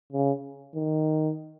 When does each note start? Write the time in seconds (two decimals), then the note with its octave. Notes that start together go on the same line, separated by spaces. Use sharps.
0.12 C#3
0.75 D#3